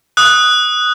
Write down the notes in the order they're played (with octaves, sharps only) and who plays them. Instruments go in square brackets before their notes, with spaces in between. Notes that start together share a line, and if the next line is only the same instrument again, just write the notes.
[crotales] D#6 F#6